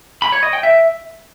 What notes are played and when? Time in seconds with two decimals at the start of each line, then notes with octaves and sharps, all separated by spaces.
0.22 B5
0.32 C#5
0.43 D#5
0.53 G5
0.63 E5